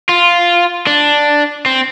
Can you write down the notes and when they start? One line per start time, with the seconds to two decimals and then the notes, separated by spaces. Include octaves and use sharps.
0.09 F4
0.87 D4
1.66 C4